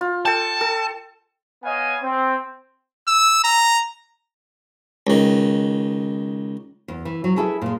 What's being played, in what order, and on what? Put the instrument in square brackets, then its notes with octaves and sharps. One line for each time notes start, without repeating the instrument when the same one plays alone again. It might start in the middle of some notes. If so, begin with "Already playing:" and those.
[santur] F4
[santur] A4 G5 [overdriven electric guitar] A5
[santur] A4
[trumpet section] B3 C#5 D#5 F5 G#5
C4
[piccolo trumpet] E6
A#5
[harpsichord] C#2 D#3
[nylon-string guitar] E2
E3
F#3
E4 G#4 A4 B4 E5
A#2 G#3